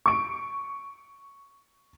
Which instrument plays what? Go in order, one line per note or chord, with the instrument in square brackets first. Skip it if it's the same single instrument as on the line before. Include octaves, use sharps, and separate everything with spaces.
[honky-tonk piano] C#6 D7